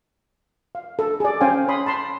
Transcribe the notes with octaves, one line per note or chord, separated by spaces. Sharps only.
F5
A4
G#4 D5
C#4 C5 F5 G5 G#5
C#5 B5 C6 D#6
A5 B5 C6